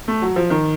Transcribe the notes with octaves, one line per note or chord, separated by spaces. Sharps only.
A3
F#3
F3
D#3